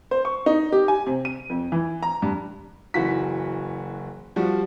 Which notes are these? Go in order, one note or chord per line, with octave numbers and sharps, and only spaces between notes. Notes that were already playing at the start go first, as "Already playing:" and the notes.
C5
C#6
D#4
G4
G#5
C3
D#7
F2
E3
A#5
G2
F#1 E3 F#4 B6
F3 G3 F#4